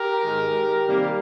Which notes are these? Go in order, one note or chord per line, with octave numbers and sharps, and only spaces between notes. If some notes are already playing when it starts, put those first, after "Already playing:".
Already playing: G4 A#4
G#2 D#3 G#3
C3 D#3 G3 A#3